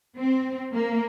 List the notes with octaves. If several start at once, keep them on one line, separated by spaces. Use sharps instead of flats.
C4
A#3